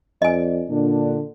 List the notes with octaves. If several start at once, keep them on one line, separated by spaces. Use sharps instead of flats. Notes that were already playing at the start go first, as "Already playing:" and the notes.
F2 D5 D#5 G#5
A#2 D3 D4